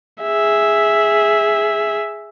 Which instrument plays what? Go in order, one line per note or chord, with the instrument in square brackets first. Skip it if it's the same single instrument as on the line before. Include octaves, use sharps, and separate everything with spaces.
[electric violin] G#4 E5